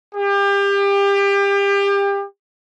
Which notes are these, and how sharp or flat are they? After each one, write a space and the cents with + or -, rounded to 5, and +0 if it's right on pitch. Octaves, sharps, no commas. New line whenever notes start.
G4 +30